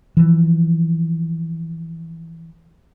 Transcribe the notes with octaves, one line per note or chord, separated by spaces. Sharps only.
E3 F3